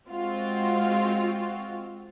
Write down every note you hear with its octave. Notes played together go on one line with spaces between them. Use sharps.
G#3 C4 F4 F#4